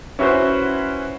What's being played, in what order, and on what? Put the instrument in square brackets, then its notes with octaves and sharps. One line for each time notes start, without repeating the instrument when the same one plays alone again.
[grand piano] C#4 E4 F#4 B4 C5